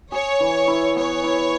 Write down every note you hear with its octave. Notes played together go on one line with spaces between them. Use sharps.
G#4 C#5
E3
E4
B3 C#5
E4